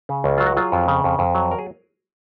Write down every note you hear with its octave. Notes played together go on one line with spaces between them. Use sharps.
C#3
C#2
F#3 F4
F#4
F#3 F4 G#4
F2
C#3
F2
F2
F#3
A#4
G#4